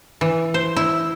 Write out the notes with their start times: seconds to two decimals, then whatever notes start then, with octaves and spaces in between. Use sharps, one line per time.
0.21 E3
0.54 C5
0.76 E4